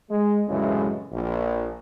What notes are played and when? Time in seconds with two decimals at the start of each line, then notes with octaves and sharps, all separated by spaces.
0.11 G#3
0.48 C2 F#2 A2 C#3 E3 G#3
1.12 A#1